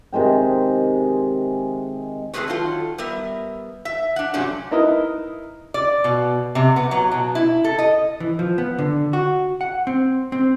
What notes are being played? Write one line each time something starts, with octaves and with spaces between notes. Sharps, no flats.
C3 D#3 G#3 G5
A3 C4 D#4 G#4 B4 C#5
D#3 F#3 F4 A4
G3 B3 A#4 E5
E5
D4 F#5
G2 C3 F#3 A3 C#4 D4
D#4 E4 A#4 B4 D#5
D5
B2
C3
B3
F#3
B2
E4
A4
D#5
E3
F3
B3
D3
F#4
F#5
C4
C4